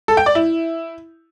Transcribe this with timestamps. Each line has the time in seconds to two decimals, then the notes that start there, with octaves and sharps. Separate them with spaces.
0.08 A4
0.17 G5
0.26 D5
0.35 E4